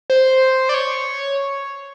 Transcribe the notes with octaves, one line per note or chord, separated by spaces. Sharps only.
C5
D5
C#5